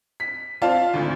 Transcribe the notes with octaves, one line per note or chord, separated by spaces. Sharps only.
B6
C4 F4 D5 F5 A5
G#1 D2